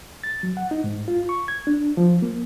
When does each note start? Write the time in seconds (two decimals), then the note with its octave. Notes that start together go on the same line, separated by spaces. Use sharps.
0.24 A6
0.43 F#3
0.57 F#5
0.71 D#4
0.84 G#2
1.08 F4
1.29 C#6
1.48 G#6
1.67 D4
1.97 F3
2.22 A#3